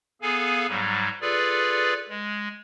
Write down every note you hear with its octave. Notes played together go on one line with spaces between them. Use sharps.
B3 G#4 A4 F5 G#5
G#2 F#3 G3
F4 G#4 A4 B4 D5
G#3